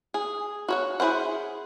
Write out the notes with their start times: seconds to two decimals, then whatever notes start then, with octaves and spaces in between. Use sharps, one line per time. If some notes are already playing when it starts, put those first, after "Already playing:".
0.14 G#4
0.69 F#4 C#5 F#5
1.00 E4 G#4 C5 F#5